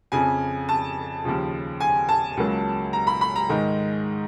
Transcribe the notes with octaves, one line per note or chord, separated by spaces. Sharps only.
F2 C#3 F3 G#5
A5
D#2 C#3 F3
G#5
A5
C#2 C#3 F#3 A#3
A#5
B5
B5
A#5
G#2 D#3 G#3